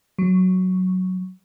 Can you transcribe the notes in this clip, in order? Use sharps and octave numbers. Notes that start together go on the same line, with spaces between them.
F#3